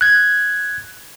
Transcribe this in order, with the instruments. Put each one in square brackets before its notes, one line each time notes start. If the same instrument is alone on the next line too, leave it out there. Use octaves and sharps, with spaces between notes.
[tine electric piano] F#6 G#6